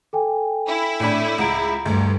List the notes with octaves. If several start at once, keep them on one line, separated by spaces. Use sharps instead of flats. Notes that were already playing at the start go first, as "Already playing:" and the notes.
A4 G5 G#5
E4
A2 D4 B5
C#2 F#5 A#5 D7
D2 G2